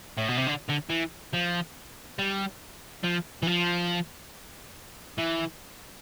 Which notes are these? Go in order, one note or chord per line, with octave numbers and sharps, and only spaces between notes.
A2
B2
C3
D3
D3
E3
F3
G3
F3
E3
F3
E3